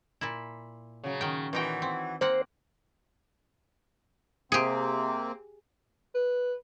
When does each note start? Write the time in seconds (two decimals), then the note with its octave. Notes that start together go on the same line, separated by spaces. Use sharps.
0.21 A#2 E4
1.04 C#3 F#3
1.21 D#3 G5
1.53 A#2 E3 D#4 F#4 G5
1.82 C4
2.21 A#3 C4 C5 F#5
4.52 C3 A#3 C4 G4 G#4
6.14 B4